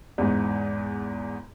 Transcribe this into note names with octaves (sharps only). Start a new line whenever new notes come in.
E2 G#2